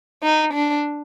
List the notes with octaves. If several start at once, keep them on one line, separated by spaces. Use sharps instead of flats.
D#4
D4